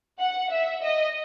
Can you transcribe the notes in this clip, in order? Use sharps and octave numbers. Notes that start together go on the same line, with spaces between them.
F#5
E5
D#5